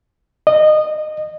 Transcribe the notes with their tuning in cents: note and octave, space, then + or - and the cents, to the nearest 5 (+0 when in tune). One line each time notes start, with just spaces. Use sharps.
D#5 -20